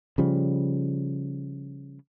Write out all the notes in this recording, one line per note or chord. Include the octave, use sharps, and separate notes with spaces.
C#3 F3 G3